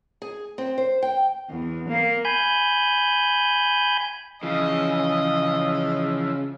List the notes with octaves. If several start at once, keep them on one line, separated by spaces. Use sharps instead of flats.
G#4
C4
C5
G5
E2
A#3
G#5 B5 G6
C#3 E3 F3 D#5